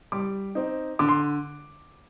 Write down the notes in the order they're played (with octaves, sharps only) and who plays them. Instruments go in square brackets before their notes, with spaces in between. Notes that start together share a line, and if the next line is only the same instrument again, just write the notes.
[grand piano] G3 D6
C4 D#4
D3 D6
C6